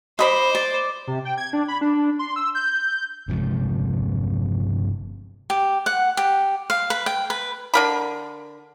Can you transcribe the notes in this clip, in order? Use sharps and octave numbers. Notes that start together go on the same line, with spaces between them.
C5 D#5 B5 D6
D5
C3
G5
G#6
D4
B5
D4
C6
E6
G6
G1 C3 F3 G#3
G4
F#5
G4
F5
B4
G5
B4
D3 A#4 B5